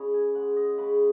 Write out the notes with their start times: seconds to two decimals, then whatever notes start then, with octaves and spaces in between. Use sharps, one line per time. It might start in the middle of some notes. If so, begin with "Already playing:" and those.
Already playing: C#3 C#4 C#5 D#5 B5
0.14 G#5
0.35 G#3 F#5
0.56 D#5
0.78 C#3 B4